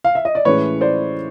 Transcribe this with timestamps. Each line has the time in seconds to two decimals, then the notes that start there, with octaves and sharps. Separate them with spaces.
0.04 F5
0.15 E5
0.25 D#5
0.35 D5
0.45 A2 E3 G#3 C#4 B4 C#5
0.81 C5 D5